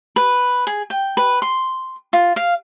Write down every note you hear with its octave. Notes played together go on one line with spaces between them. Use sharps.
B4
G#4
G5
B4
C6
F4
F5